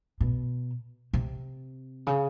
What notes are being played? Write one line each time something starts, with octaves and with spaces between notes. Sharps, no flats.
B2
C3
C#3